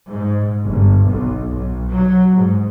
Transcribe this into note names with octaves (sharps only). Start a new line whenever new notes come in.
G#2
G1
B1
B1
F#3
G#2